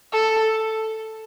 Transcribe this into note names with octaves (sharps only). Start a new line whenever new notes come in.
A4